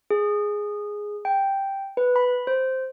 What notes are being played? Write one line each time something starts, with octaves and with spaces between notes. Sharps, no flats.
G#4
G5
B4
B5
C5